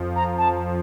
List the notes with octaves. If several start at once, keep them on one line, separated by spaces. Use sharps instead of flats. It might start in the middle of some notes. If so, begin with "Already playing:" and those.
Already playing: F2 F3
A#5
A5